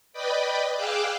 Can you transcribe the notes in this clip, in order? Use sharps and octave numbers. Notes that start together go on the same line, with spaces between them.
B4 D5 D#5 G5 B5
G#4 F5 G5 D6 E6 F#6